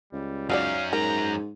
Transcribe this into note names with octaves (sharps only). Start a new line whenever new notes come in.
C#2 G3
F#2 F#3 C#4 D#4 D5 F5
G#2 A#4 A#5